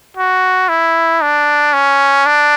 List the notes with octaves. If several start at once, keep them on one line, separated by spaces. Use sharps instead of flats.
F#4
E4
D4
C#4
D4